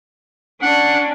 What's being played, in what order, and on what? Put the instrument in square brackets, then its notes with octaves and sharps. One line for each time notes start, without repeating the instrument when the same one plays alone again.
[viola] C#4 D4 [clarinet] F#5